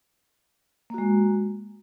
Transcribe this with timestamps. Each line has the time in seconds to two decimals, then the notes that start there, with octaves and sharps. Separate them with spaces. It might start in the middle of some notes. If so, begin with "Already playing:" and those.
0.90 A#3
0.94 F#4
0.98 G#3